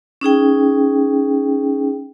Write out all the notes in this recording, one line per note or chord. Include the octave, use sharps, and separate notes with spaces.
C#4 D#4 G#4 G5